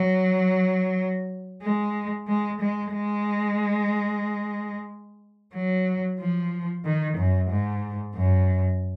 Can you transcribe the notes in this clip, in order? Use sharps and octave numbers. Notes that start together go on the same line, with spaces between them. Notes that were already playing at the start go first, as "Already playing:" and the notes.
Already playing: F#3
G#3
G#3
G#3
G#3
F#3
F3
D#3
F#2
G#2
F#2